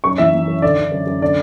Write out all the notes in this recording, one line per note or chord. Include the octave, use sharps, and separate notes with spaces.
F#2 C#6
E3 E5
E3
F#2
D3 D5
D3
F#2
F#2
D3 D5